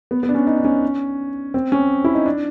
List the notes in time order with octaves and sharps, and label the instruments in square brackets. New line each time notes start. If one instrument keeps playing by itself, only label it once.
[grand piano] B3
B3
D4
C#4
D#4
D4
C#4
C4
C#4
E4
D#4
D4